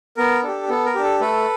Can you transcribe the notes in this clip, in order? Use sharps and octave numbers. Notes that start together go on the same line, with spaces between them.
B3 A#4
D4 G4 A4
B3 A4
A#4
D4 G4
A4
A3 A4 B4